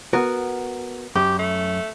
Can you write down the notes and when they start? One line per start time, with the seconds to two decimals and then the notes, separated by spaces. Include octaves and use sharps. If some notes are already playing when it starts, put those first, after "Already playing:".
0.13 B3 F#4 A#4
1.15 F#2 G4
1.39 A3